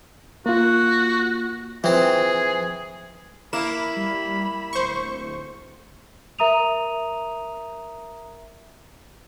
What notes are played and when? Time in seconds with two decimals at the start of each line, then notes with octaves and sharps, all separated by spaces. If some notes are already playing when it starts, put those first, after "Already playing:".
0.46 A#3 F4 F#4
1.84 E3 F3 C4 G#4
3.53 A#3 E4 B5 E7
3.97 G3
4.73 D1 C5 C#6
6.39 A#4 E5 A#5 D#6 D#7 F7